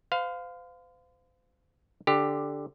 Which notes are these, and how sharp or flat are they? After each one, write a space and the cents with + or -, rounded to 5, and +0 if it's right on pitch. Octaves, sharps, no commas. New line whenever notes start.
C5 -40 F5 +10
D3 +0 G4 +10